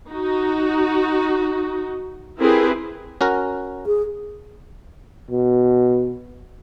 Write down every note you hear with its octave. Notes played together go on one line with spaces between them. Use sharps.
D#4 F#4
C4 E4 G4 G#4 A#4 B4
C#4 F#4 A#4
G#4
B2